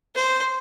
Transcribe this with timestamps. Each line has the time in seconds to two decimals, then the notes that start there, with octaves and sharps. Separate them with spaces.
0.15 C5